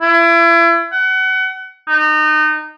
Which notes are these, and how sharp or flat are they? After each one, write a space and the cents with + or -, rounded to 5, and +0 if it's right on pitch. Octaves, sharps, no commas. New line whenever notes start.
E4 +35
F#5 +30
D#4 -25